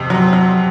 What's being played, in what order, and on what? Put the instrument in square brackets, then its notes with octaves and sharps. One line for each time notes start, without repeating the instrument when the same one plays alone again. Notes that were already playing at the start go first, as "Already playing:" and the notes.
Already playing: [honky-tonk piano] F2 C3
F#3
F#3